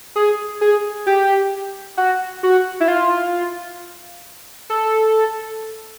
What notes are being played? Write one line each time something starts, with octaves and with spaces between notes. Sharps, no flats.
G#4
G#4
G4
F#4
F#4
E4
F4
A4